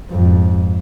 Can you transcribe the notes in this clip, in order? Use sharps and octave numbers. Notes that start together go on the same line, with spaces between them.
F2 G#2